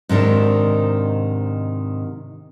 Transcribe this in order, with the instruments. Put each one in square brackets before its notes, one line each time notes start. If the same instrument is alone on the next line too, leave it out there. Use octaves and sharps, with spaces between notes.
[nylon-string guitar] G#2 C3 D#3 D4